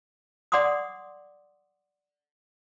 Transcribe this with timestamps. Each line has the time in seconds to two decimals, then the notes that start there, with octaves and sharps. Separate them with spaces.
0.52 D5 F#5 C6 D6 D#6